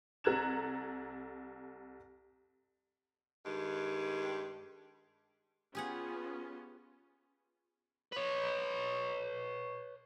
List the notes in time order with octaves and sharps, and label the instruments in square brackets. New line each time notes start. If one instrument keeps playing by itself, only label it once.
[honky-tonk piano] C2 A4 A#5 F#6 G#6 E7
[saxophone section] G2 D#3 G#3 G4
[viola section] B3 C#4 F4 [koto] G4 G#4 F#5
[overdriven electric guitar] B4 C#5